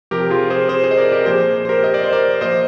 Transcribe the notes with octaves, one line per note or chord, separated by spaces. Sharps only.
F2 C3 F3 G4 A#4
F4 G#4
G#4 C5
G#4 C5
G#4 C5
D#5
A#4 D5
G4 A#4
A#2 F3 G#4 C5
C5
G4 A#4
D#5
D5
C5
A#4 D5
A#2 F3 C5 D#5